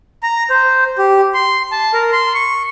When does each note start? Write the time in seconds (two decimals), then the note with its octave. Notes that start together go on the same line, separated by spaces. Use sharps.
0.23 A#5
0.50 C5
0.98 G4
1.34 C6
1.72 A5
1.94 A#4
2.12 C6
2.34 C#6